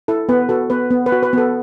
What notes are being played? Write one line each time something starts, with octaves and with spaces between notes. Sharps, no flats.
E4 A4
B3 B4
F#4 A4
B3 B4
B3
B4
F#4
B4
B3 A4